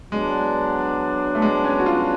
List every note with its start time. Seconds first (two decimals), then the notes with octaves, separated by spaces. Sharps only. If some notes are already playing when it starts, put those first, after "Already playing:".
0.12 F#3 G#3 B3 D4
1.35 A3
1.42 G#3
1.64 C#4
1.80 F#4
1.86 F4